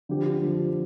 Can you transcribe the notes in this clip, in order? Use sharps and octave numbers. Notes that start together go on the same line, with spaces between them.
D3 F3 C4 G4
D3 F3 C4 G4